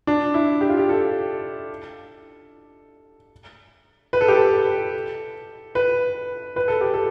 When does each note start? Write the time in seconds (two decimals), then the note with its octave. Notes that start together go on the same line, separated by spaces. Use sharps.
0.07 D4
0.34 E4
0.61 G4
0.69 F4
0.78 G4
0.89 A4
4.13 B4
4.21 A4
4.28 G4
4.35 A4
5.75 B4
6.56 B4
6.68 A4
6.81 G4
6.94 A4